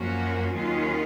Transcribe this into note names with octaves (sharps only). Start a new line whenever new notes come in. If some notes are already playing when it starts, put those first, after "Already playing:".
Already playing: F#2 F3 A#3 C#4 F#4
D#2 D#3 F#3 C#4 F4